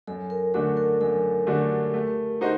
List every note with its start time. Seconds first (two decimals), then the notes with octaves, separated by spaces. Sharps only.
0.07 F#2 A4
0.30 A#4
0.54 D3 A3 D4 F#4 A4
0.77 A#4
1.01 F#2 A4
1.47 D3 A3 D4 F#4 G4
1.94 A3
2.41 D#4 F#4 C5 D#5